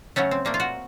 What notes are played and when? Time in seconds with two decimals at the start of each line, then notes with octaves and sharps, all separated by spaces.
0.16 C#3 F#3 A3 C#4
0.31 C4
0.45 A#2 A3 A#3
0.54 F4
0.60 F#4